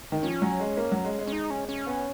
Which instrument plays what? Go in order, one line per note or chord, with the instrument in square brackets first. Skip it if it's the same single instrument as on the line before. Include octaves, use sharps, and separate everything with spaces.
[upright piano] D#3
[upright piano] F3 [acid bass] C#4
[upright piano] F#3
G#3
A#3
F#3
G#3
G#3
[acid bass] C#4
D#4
C#4
C#4
[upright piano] B3